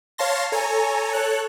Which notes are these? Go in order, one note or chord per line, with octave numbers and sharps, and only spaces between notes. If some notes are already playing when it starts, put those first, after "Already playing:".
C#5 F5 A5 C6 A#6
A4 C#5 G#5 A#5
A4 C#5 F#6